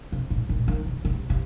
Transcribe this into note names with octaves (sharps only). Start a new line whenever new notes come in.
C3
A2
A#2
D#3
C3
C3
C3